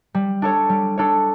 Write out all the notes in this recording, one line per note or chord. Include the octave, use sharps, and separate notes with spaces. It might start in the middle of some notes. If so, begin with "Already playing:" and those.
G3
D4 A4 C#5
G3
D4 A4 C#5